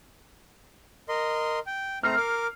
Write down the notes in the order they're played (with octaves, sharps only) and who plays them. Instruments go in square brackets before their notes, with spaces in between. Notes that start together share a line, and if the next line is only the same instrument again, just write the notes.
[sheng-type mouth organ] A#4 D#5 C6
G5
[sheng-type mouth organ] A3 C4 A#5 [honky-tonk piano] F6 C7
[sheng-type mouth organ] A#4 D6